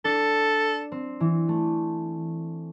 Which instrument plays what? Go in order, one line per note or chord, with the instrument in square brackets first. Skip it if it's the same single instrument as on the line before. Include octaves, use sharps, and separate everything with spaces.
[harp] D4 [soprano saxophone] A4
[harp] C4
E3
A3